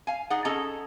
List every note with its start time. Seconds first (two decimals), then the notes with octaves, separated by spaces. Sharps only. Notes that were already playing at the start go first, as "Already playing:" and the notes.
0.07 F5 G#5
0.30 D#4 G#4 D5 F#5
0.45 C#4 G#4 A4 D#5 A5 A#5